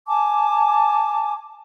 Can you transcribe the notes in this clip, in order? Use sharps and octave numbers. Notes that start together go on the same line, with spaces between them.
G#5 A5 D6